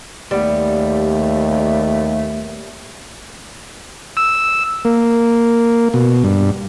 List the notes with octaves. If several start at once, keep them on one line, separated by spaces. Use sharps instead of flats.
D#2 G3 A3 B3
E6
A#3
B2
G2